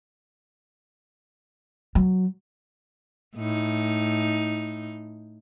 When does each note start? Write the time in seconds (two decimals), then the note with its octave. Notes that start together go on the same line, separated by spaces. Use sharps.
1.95 F#3
3.36 A2 D#4